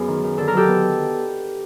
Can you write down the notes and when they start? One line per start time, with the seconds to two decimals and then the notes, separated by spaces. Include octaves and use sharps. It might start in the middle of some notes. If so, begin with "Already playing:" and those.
Already playing: F#2 B3 G#4
0.08 D#3
0.24 D#3
0.38 D3 A4
0.48 A#4
0.53 F#3 G4 A4
0.68 B3